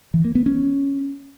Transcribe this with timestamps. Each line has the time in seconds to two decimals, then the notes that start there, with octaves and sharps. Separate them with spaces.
0.14 E3
0.25 A#3
0.35 B3
0.46 C#4